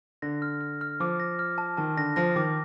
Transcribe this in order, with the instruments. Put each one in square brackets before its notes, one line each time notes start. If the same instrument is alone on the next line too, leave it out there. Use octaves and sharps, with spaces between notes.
[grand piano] D3 [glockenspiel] A#6
[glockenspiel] F6
F6
F6
[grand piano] F3 [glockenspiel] D6
[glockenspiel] A#6
F6
A5
[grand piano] D#3 [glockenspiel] A5
[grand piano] D3 [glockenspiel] A#6
[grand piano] F3 [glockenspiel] A#6
[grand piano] D#3 [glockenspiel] D6